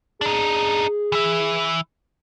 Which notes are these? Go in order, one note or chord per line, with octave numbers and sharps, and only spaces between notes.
D4 D#4 G#4
E3 E5